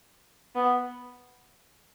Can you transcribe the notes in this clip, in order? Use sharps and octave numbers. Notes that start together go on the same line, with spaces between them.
B3